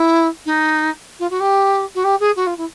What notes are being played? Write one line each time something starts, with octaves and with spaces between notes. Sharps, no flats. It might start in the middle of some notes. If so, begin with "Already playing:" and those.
Already playing: E4
D#4
F4
F#4
G4
F#4
G4
G#4
F#4
F4
E4